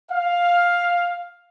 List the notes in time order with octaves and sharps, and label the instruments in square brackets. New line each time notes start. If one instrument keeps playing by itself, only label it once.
[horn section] F5